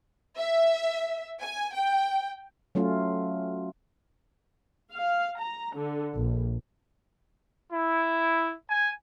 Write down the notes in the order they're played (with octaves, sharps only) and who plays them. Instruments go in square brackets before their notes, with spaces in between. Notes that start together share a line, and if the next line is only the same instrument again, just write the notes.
[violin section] E5
G#5
G5
[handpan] F#3 A3 C#4 F4
[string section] F5
A#5
D3
A#1
[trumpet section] E4
G#5